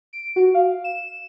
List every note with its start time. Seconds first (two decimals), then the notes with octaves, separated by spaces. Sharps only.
0.13 D7
0.36 F#4
0.54 F5
0.84 E7